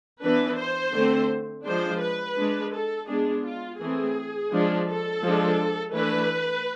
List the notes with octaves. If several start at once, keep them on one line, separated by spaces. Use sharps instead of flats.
E3 B3 D4 B4
C5
D3 A3 C4
F3 G#3 D4 C5
B4
G#3 D4
A4
G#3 B3 D4 G#4
F4
E3 A3 C4 G#4
F3 G#3 D4
A4
F3 G#3 D4
E3 A3 D4 B4